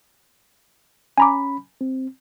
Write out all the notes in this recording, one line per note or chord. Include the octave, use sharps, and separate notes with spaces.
C#4 G#5 A#5 B5 D6
C4